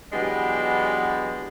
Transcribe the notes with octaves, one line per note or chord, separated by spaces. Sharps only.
E3 F#3 G#3 B3 D4 G4